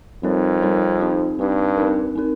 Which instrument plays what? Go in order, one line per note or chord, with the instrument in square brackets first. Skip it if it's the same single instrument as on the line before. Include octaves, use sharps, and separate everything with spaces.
[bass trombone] F2 [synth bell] G3 C4 D#4 A#4 C#5
[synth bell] G3 C4 D#4 A#4 C#5
C4 D#4 G4
[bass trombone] G2 [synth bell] C4 D#4 G4
[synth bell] C4 D#4 A#4
C4 D#4 A#4